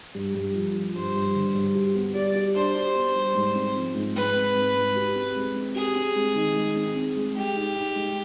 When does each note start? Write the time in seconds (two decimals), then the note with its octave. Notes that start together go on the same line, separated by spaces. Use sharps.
0.15 G2
0.35 G2
0.55 F3
0.75 F3
0.95 G2 C5
1.15 G2
1.35 D3
1.55 G2
1.75 G4
1.95 B3
2.15 G3 D5
2.35 G4
2.55 D4 C5
2.76 G4
2.96 B3
3.15 G3
3.35 G#2
3.55 C4
3.76 F3
3.95 G#2
4.16 G#2 B4
4.36 C4
4.55 G#2
4.76 G#2
4.96 G4
5.15 C4
5.36 G#3
5.56 C4
5.76 G4 G#4
5.96 C4
6.16 G#3
6.36 D#3
6.56 G#3
6.76 C4
6.96 C4
7.16 G#3
7.36 G#3 G4
7.56 D#4
7.77 D#4
7.96 G#3